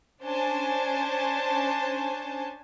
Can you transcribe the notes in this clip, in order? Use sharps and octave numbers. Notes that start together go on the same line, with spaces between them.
C#4 D4 C5 G#5 A5